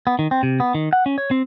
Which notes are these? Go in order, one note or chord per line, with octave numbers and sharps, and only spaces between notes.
B3
D#3
C4
C3
B3
D#3
F#5
C#4
C#5
C4